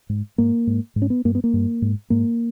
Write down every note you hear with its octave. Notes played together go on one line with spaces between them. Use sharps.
G#2
G#2 A#3
G#2
G#2
C#4
B3
G2 A#3
B3
A#3
G2
G#2
G#2 A#3